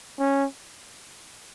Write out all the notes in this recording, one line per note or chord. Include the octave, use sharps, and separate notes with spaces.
C#4